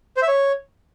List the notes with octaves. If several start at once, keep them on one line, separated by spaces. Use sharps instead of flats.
C5
E5
C#5